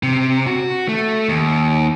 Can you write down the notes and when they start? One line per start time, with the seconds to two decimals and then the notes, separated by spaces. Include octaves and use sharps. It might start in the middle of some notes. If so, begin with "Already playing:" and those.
0.03 C3
0.47 F#4
0.88 A3
1.29 D#2